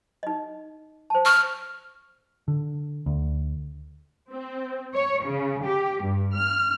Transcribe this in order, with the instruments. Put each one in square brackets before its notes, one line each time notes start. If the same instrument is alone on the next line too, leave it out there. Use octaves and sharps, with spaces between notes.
[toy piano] D#4 D#5
C5 A5
[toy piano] C#6 [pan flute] F6
[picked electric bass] D3
D2
[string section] C4
C#5
C#3
G4
G2
F6